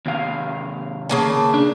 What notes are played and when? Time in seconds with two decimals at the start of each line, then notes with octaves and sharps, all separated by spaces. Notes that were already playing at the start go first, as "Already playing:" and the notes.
0.06 D#2 C3 F5
1.09 C#3 A#3 A5
1.54 D4